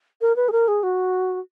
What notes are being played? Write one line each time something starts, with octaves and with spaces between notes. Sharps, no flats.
A#4
B4
G#4
A#4
G#4
F#4